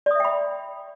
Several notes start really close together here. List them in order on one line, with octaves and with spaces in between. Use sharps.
D5 D#6 E5 G5 B5